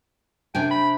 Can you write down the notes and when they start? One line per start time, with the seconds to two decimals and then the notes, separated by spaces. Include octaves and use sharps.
0.55 C3 D4 G5 G#5
0.71 B5